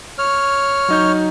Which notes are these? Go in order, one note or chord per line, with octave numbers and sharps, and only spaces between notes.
C#5 F6
F#3 D#4 G6